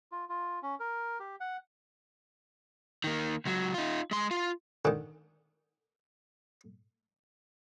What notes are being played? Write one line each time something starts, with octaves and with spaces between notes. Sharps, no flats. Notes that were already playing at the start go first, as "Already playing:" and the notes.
F4
F4
C#4
A#4
G4
F#5
D#3 A#3
C#2 F#3
D#4 F4
G#3 C6
F4
D3 D#3